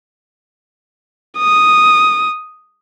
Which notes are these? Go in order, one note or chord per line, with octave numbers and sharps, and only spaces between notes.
D#6